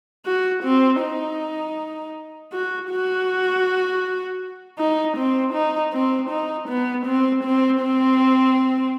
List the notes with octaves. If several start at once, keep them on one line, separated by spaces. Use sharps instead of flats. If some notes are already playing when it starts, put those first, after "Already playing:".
F#4
C4
D#4
F#4
F#4
D#4
C4
D#4
C4
D#4
B3
C4
C4
C4